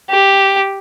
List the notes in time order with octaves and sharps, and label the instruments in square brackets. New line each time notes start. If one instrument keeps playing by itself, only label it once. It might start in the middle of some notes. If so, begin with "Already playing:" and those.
[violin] G4